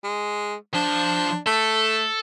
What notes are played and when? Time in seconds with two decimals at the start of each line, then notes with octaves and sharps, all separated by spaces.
0.04 G#3
0.74 F3 D4 C5
1.46 A3 A4